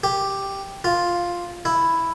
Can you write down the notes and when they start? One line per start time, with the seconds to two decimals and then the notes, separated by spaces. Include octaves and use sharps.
0.04 G4
0.84 F4
1.65 E4